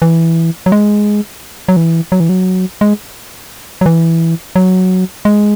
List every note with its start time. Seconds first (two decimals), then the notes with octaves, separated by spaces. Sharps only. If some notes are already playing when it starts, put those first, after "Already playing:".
0.02 E3
0.66 F#3
0.72 G#3
1.68 F#3
1.77 E3
2.12 F#3
2.20 E3
2.29 F#3
2.81 G#3
3.81 F#3
3.86 E3
4.56 F#3
5.25 G#3